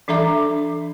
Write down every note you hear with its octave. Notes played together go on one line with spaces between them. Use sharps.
E3 D4 A4 E5 A#5 D6